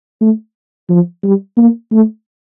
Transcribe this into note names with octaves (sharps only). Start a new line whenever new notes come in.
A3
F3
G3
A#3
A3